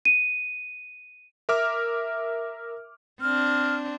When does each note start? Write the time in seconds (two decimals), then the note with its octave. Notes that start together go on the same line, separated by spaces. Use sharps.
0.05 D#7
1.49 A#4 E5 D6 F6
3.21 C4 D4 F6